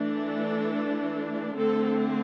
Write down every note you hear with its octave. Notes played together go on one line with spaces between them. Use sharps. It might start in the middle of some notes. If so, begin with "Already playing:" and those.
Already playing: E3 A3 D4
A4
D3 A3 C4 A4